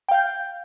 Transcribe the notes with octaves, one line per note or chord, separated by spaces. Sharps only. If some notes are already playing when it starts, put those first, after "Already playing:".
F5 G5 G6